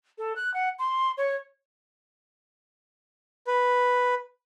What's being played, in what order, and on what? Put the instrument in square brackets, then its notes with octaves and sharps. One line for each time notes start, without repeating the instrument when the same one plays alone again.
[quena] A4
F#6
F#5
C6
C#5
[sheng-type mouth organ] B4